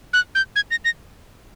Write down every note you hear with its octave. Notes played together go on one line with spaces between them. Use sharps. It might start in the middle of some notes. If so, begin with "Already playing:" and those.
F#6
G6
G#6
A#6
A#6